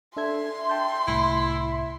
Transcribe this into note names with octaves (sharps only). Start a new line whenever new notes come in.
D4 A4 E5 C6 G#6
G5 A5 G6
C2 A2 E4